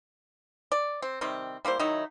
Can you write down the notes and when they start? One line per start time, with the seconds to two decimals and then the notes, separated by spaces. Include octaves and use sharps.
0.72 D5
1.02 C4
1.21 C3 D#3 G3 C4
1.65 G3 A#3 E4 C5
1.79 D#3 F#3 D#4 E4